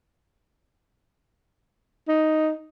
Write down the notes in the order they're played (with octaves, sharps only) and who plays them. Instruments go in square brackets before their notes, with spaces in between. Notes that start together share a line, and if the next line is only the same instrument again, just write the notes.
[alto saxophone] D#4